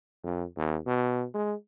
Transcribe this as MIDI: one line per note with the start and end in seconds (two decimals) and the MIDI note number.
0.24 0.44 41
0.57 0.78 39
0.86 1.26 47
1.34 1.54 56